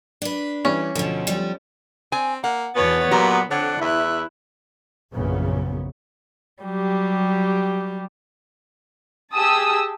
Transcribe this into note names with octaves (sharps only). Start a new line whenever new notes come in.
D4 B4
E3 G3 C#4
D2 B2 F3
F3 G3
C4 G#5
A#3 F#5
E2 B2 B3 C#5 A6
A#2 F#3 A#3 F#4 G4
F2 D3 D4 C#5 F#5
E2 E4 E5 F#6
A#1 F#2 A#2 C#3 B3
F#3 G3 G4
G4 G#4 A5 D#6 E6